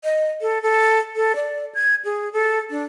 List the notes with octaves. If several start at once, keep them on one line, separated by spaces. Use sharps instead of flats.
D#5
A4
A4
A4
D5
G#6
G#4
A4
D4